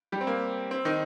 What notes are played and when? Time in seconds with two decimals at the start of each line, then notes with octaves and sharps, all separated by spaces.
0.12 G3 G4
0.21 C4
0.27 A#3
0.71 C4
0.85 D#3 D#4